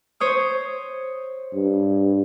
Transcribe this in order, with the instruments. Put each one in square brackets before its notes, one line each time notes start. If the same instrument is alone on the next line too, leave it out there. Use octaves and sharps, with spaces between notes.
[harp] C5 C#5 D#6
[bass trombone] G2